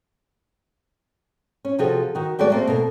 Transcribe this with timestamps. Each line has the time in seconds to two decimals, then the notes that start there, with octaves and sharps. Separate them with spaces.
1.65 C#4
1.78 C3 F3 F4 F#4 G#4 A4
2.15 D#3 F#4
2.39 G3 A3 F#4 G#4 B4 D5
2.50 A3 A#3 C4
2.68 B2 A4 A#4